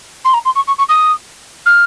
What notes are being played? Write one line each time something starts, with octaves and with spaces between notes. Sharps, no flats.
C6
A#5
C6
C#6
C#6
C#6
D#6
F6